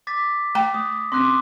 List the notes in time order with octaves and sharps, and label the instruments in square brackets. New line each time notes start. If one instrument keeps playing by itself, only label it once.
[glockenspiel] D6 A6 B6
[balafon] A3 G5 A#5
[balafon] A3 [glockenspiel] D#6
[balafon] C4 C#4 [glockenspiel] C6 D6 F#6